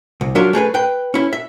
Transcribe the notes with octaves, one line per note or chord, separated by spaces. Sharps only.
C2
F#3 D4 F4 A#4 E5
A3 G#4 A#4 B4
B4 G5
C#4 E4
E5